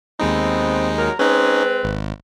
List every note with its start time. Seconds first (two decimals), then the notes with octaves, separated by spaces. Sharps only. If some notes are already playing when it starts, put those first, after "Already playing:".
0.19 D#2 G#3 B3 C4 D#4
0.99 F#3 A#4
1.19 G#3 C4 C#4 D#4 B4
1.83 G#1